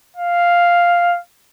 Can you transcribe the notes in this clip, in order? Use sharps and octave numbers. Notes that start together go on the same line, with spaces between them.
F5